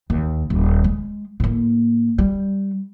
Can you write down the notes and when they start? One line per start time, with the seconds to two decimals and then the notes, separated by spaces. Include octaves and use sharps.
0.10 D#2
0.50 D#1
0.84 G#3
1.40 A2 A#3
2.18 G3